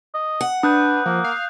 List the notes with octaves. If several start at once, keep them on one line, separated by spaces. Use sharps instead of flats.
D#5
F#5
D4 B4 D#6 F#6 G6
F3 A#3
F5